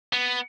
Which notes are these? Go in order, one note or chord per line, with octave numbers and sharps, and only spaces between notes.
B3